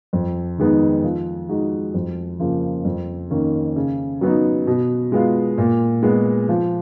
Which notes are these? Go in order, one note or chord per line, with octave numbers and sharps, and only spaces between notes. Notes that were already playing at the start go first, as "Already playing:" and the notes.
F2
D#3 G#3 B3 D#4
F3
G#3 D#4 F#4
F2
C#3 F3 A#3
F2
D#3 A#3 C#4
C#3
F#3 B3 D#4
B2
G#3 B3 F4
A#2
G#3 B3
F3